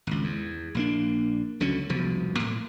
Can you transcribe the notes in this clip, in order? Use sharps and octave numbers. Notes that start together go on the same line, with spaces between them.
G#1 C#2
E2
A#1 A#3 D4
C#2 D3 F#3 C#4
E1 C2 B2 F3
A2